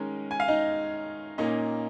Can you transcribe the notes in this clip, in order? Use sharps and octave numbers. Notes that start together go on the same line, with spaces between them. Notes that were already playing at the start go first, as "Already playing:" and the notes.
Already playing: D#3 G#3 C#4 A#4
G#5
F5
D#4 D#5
A#2 A#3 C#4 D#4 D#5